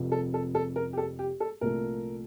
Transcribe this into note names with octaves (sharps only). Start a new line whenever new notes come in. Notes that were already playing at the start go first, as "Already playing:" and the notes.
Already playing: F1 F2 C3 F3
A4
A4
A4
A#4
G4
A4
G4
A4
C2 A#2 F3 A3 A#4